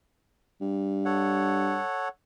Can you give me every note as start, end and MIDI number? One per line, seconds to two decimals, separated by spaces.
0.61 1.80 43
1.05 2.08 69
1.05 2.08 73
1.05 2.08 78